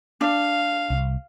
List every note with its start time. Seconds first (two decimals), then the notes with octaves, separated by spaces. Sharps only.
0.21 D4 F5
0.90 C2